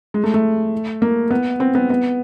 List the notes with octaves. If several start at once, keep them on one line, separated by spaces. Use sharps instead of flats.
G#3
A3
A3
A#3
B3
C4
B3
B3